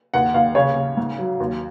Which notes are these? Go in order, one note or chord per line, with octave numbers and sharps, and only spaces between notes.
D#2 F#5
D#2 F5
C#3 C#5
C#3
G#2
F#3
D#2